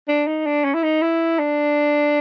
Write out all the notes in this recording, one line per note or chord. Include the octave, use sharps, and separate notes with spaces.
D4
D#4
D4
C#4
E4
D#4
E4
D4